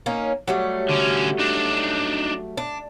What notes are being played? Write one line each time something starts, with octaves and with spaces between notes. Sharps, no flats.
A#3 C#4 D#4
F#3 G3 A3
D3 C#4
D4 D#4
D4